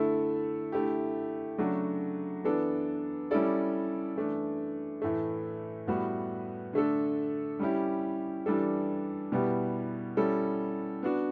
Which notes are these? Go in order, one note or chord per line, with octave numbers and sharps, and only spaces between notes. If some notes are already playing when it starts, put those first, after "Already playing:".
Already playing: D3 A3 E4 A4
D3 A3 E4 G4
C#3 F#3 A3 D4 F#4
E3 B3 D4 A4
G3 C#4 E4 A4 D5
E3 A3 D4
A2 E3 A3
A2 G3 B3 F#4 B4
D3 A3 D4 A4
G3 C#4 E4 G4
E3 G3 D4 A4
B2 G3 B3 E4 G4
G3 C#4 E4 A4
B3 D4 F#4